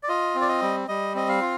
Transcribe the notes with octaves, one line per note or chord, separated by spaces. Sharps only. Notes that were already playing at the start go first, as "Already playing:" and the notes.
D5
F4 D#5
C4
D5
D#5
G3
G3 D#5
C4 D#5
F5
F4